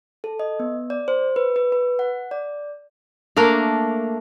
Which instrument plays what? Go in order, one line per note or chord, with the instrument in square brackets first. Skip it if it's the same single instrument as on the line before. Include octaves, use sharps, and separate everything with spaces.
[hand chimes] A4
D#5
B3
D5
C5
B4
B4
B4
F#5
D5
[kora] A3 A#3 D4 A#4